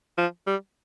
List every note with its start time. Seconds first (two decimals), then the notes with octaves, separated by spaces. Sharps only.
0.18 F3
0.47 G3